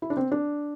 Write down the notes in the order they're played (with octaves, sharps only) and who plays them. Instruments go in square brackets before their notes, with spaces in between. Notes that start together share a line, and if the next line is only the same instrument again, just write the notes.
[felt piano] E4
D4
C4
D4